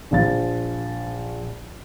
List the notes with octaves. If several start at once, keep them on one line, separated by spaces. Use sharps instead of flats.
A#1 F3 A6